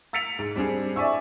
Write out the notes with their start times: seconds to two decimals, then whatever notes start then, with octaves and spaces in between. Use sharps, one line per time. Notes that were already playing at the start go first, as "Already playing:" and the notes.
0.13 E6 A6 B6 C#7 D7 F7
0.39 G#2
0.55 G3 C4 D4 G#4
0.96 D5 E5 G#5 C#6 E6